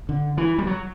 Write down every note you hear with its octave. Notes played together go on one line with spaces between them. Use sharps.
D3
E3
G3
F#3